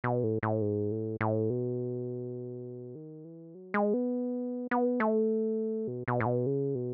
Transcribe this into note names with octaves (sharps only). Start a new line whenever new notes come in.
B2
A2
A2
G#2
A2
A2
B2
D#3
E3
F#3
G#3
B3
B3
A3
B2
B2
A2
B2
C#3
B2